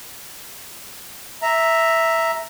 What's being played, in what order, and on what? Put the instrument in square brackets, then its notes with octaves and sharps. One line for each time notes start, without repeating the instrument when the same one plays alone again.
[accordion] E5 A#5